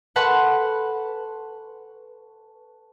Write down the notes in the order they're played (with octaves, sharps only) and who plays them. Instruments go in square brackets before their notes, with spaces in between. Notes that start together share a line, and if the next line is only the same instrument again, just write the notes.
[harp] A4 B4 F#5 A5 C6 C#6